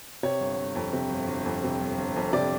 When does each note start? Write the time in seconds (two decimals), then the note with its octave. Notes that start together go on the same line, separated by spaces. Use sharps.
0.23 C3 C#5
0.40 G1
0.58 G1
0.75 F2
0.93 C3
1.10 G1
1.28 G1
1.46 F2
1.64 C3
1.81 G1
1.98 G1
2.16 F2
2.33 C3 D5